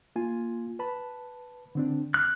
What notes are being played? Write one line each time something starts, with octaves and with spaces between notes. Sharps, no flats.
A#3 F4 G#5
B4 A5 B5
D3 C4 D4
F6 F#6